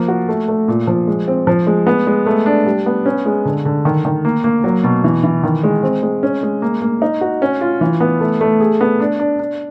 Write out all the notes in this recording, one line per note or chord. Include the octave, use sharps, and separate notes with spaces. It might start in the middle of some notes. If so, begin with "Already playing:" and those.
Already playing: F3 A#3
F#4
A3
A3
A#2
F3
G#3
C4
F3
G#3
B3
G#3
A3
D4
G3
B3
C#4
G#3
D3
D3
D#3
D#3
A#3
A#3
F#3
B2
E3
E3
D#3
G#3
C4
G#3
C#4
G#3
A#3
A#3
D#4
F#4
C#4
F4
E3
B3
A3
A3
G#4
B3
D4
D4
D4